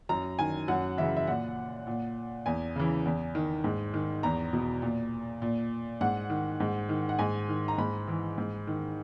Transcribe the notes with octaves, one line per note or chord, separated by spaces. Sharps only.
F#2 A#5
D#3 G#5
F#2 F#5
C#3 E3 E5
E5
A#2 F#5
A#2
E2 G#5
C#3 E3
E2
D#3
G#2
D#3
E2 A#5
B2
A#2
A#2
G#2 F#5
D#3
G#2
D#3
F#5
G#2 G#5
D#3
A#5
G#2 B5
E3
G#2
D#3